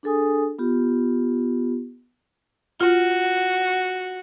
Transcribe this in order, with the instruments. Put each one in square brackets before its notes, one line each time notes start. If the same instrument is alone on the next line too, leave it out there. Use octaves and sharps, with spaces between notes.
[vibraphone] D4 G#4 A4 G#5 D#6
B3 F4 G4
[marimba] F4 [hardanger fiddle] F#4